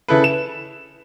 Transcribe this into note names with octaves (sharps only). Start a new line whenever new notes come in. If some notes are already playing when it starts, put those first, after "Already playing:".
C#3 E4 A4 B4
E7